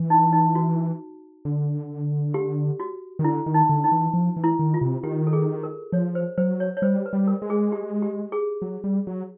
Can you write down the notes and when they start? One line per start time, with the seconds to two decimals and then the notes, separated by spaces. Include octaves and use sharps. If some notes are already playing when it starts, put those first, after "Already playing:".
Already playing: E3
0.10 D#4
0.33 D#4
0.55 F#4
1.45 D3
2.34 G4
2.80 F#4
3.19 D#3
3.24 D3 E4
3.46 D#3
3.54 D#4
3.69 D3
3.84 D#4
3.92 E3
4.14 F3
4.37 E3
4.44 E4
4.59 D#3
4.74 F4
4.81 C3
5.03 D#3 G4
5.27 A4
5.33 G#4
5.63 A#4
5.92 F3 C#5
6.15 C5
6.38 F#3 C5
6.60 C#5
6.77 C#5
6.82 G3 C5
7.06 B4
7.13 G3
7.27 A#4
7.42 G#3
7.50 G#4
7.72 G4
8.02 G4
8.32 G#4
8.62 F#3
8.84 G3
9.07 F#3